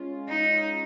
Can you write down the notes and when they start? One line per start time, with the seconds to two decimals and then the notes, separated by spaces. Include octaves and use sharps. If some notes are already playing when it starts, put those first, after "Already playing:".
Already playing: G#3 C#4 F4
0.28 D#4